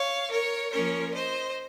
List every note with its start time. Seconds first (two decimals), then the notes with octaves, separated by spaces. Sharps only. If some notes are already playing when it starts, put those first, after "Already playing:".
Already playing: C#5 F5
0.31 A#4 C#5
0.72 F3 A#3 C#4 A#4 C#5
1.14 C5 D#5